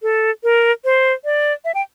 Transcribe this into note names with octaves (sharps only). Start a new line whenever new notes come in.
A4
A#4
C5
D5
E5
G5